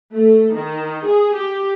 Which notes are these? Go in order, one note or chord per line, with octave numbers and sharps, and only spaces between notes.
A3
D#3
G#4
G4